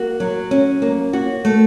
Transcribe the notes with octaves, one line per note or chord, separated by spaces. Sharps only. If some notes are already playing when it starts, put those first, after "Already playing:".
Already playing: A#3 F#4
F#3
C#4
A#3
F#4
A3